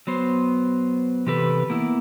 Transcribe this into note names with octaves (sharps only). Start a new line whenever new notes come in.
F#3 B3 C5
C3 E3 G4 A4 B4
A#3 B3 E4